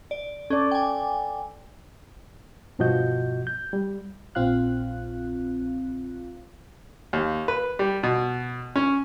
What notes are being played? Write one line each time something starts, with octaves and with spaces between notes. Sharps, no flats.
D5
C#4 A4 D5
G5 G#5
G2 B2 F3 F#4 D#5 G6
G6
G3
A#1 C4 F4 F5 F#6
D#2
B4
G3
B2
C#4